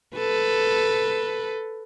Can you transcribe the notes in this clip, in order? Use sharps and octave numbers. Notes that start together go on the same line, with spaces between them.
A4 B4